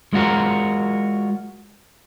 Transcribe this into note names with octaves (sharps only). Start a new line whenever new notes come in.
G#3 F4 F#4 A#4